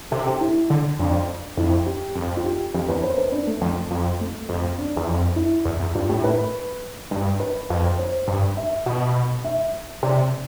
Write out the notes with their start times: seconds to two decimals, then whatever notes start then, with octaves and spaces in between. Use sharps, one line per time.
0.11 C3 A4
0.27 G4
0.41 E4
0.70 D3
0.99 F2 D4
1.57 F2 E4
1.86 G4
2.15 F2
2.37 F4
2.45 G4
2.74 F2 G4
2.88 E2 B4
3.03 C5
3.18 B4
3.32 D4
3.47 A3
3.61 F2
3.91 F2
4.20 A3
4.49 F2
4.78 D4
4.96 E2
5.07 F2
5.36 E4
5.65 E2
5.80 E2
5.95 G2 F4
6.09 A2 G4
6.24 B4
7.11 G2
7.40 B4
7.70 F2
7.99 C5
8.28 G2
8.57 E5
8.86 B2
9.44 E5
10.03 C3 D5